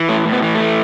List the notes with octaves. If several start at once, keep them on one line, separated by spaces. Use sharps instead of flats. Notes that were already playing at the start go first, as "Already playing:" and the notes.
Already playing: E3
A2 A3
A2
B3
E3
A3
E3